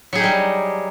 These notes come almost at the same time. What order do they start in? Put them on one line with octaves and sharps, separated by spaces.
F#3 G#4 G4 D#4 G3